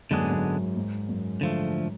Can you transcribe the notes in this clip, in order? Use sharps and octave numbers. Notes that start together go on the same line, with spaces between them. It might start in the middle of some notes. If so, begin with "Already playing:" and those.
F#2 D3 G#3 B3 D4 G#4
G#2
F#2
G#2
F#2
D3 F3 A3